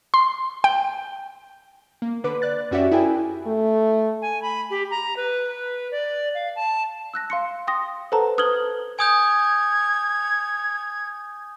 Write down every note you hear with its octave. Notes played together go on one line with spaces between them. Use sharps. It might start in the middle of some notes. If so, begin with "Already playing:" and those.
C6
G5
A#3
D3 B4 D6
D5 F#6 A6
F#2 C#4 F#4 G4 D5 E5
E4 G#4 A#4 G5 G#5
A3
G#5
B5
G4
A#5
B4
D5
F5
A5
E6 F#6 A#6
F5 C6 C#7
G5 C6 D#6 A#6
A4 B4 C5 F#5 A5 A#5
B4 D#6 F6 G#6 F#7 G7
G#5 D#6 G6 G#6